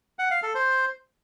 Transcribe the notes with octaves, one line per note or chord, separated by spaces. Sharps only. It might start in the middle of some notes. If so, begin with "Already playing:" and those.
F#5
F5
A4
C5